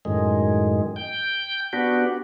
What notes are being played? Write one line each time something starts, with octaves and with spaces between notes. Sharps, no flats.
F#2 A2 D#3 G#3
G5 G6
B3 D4 F#4 G4